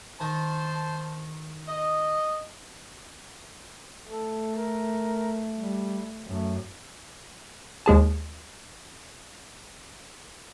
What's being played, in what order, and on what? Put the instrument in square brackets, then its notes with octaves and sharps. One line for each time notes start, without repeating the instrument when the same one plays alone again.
[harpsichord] D#3 [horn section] C5 A5
[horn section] D#5
[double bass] A3 [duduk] A4
[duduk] A#4
G3
[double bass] F#2 [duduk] A3
[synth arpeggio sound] D#2 G#3 G#4 A5